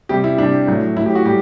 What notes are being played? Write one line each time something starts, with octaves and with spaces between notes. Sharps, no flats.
C3 G3 G4
E4
C3 G3 D4
A2 F#3
A2 F#3 E4
G4
F#4
A2 G3 G4